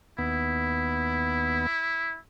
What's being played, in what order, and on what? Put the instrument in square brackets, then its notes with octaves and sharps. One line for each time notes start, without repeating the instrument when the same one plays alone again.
[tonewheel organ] D#2 B3 [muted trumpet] E4